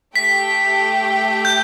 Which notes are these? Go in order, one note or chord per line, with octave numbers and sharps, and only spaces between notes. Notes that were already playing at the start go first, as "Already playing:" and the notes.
A3 G4 E5 G5 B6
G6